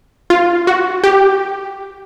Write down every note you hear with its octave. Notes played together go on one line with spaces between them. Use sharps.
F4
F#4
G4